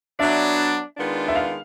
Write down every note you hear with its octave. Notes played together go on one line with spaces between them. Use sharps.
F#3 B3 D4 E5
D#3 G#3 B3 D4 F4
E5
F5